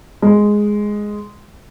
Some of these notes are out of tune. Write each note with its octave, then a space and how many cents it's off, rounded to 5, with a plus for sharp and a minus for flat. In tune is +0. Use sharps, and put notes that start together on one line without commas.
G#3 +0